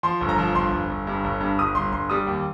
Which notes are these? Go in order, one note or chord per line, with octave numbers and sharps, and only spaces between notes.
F3 C6
G1
A#5
F3
G1 C6
G1
G1
G2
G1
G2
G1 D#6
G1 C6
G1 C6
G3 D#6
D#2